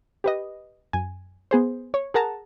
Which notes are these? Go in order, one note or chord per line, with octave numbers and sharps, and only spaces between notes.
G4 B4 D#5
F#2 G#5
B3 G#4 C5
C#5
G#4 A#4 F#5 A5 A#5